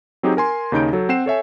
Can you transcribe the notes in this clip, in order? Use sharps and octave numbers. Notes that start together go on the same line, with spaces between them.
F#3 C4 D#4 G4 G#4
A#4 G#5 C6
D#2 C#3 D#4 G6 D7
F#3 A4
C4 F#5 C7 E7
A4 C#5 E5 G#5